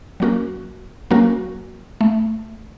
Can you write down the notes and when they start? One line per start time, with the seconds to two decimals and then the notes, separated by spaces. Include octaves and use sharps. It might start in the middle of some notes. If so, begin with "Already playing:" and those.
0.20 F#3 A#3 C#4 F#4 A#4
1.11 F#3 A#3 C#4 F#4 A#4
2.01 A3